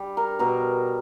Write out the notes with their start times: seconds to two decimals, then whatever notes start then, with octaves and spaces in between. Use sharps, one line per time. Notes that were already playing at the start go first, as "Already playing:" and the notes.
Already playing: G3
0.17 A#4
0.39 B2 A#4